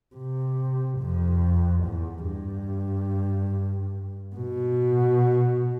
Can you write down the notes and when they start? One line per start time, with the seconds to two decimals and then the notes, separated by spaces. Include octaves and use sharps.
0.16 C3
0.99 F2
1.84 E2
2.26 G2
4.36 B2